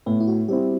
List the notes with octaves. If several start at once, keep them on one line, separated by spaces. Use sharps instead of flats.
A2 B3
E4
F#4
G3 C4 E4 G4